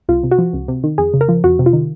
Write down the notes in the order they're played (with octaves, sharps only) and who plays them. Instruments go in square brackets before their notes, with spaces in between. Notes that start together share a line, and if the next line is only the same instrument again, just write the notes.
[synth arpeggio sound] C2 F4
C3
F#4
F3
C#2
C3
D#3
F2 G#4
C#3
A#4
F3
F2 F#4
C3
F4
D#3